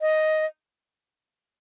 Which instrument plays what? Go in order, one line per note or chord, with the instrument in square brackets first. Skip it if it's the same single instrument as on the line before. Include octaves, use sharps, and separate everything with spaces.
[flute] D#5